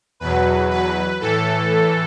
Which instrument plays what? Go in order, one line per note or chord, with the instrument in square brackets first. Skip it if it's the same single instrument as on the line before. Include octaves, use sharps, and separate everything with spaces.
[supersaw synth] E2 B2 F#3 B4
B4
A2 E3 A4